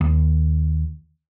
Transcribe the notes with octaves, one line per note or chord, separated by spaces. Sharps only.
D#2